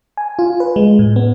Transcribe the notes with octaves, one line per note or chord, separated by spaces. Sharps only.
G#5
F4
B4
G#3
A2
B3